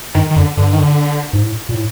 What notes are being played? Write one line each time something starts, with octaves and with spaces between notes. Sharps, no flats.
G2 D#3
D#3
F#2 D3
G2 D3
D#3
D3
G#2
A2
A#2
A2